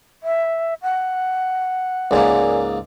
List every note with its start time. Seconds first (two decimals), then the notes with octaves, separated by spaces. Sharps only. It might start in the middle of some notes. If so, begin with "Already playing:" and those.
0.23 E5
0.83 F#5
2.11 C#2 G#2 A#3 A#4 D5 G#5